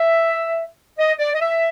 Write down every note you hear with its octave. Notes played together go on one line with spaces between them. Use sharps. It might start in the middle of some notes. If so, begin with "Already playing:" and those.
Already playing: E5
D#5
D5
D#5
E5